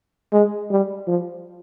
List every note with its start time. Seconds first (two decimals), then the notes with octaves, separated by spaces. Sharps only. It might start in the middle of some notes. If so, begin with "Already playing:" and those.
0.32 G#3
0.70 G3
1.07 F3